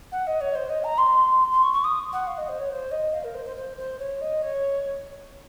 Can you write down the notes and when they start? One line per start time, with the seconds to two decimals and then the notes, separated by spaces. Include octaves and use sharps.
0.12 F#5
0.27 D#5
0.41 C#5
0.55 C5
0.69 D#5
0.84 A#5
0.98 C6
1.51 C6
1.63 C#6
1.73 C#6
1.84 D#6
2.13 F#5
2.27 F5
2.38 D#5
2.49 C5
2.59 C#5
2.70 C5
2.91 D#5
3.13 F5
3.24 A#4
3.35 C5
3.45 C5
3.56 C5
3.77 C5
3.99 C#5
4.21 D#5
4.42 C#5